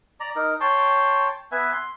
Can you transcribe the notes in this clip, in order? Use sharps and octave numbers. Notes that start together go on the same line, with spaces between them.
D5 A#5
D#4 A#4
C#5 G5 A5 C6
B3 B4 E5 G#5
C6